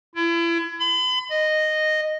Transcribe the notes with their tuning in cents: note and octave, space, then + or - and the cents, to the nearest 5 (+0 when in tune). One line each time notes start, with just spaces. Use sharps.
E4 +35
B5 +40
D#5 -10